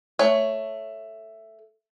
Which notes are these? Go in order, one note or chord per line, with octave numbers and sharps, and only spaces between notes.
A3 C#5 G#5